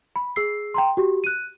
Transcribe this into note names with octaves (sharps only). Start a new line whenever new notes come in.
B5
G#4 E6 C7
G5 A#5 C6
F#4 G4
F#6 D#7